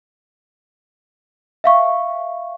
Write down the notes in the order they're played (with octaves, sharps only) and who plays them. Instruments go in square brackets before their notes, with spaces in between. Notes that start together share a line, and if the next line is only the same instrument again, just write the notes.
[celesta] E5 F5 C#6